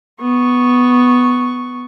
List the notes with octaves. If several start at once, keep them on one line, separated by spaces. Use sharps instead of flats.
B3 C#6